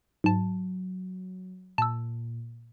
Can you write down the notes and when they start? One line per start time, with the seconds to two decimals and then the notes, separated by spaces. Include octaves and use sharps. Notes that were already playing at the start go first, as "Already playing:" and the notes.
0.24 G#2 F#3 A5
1.78 A#2 A5 E6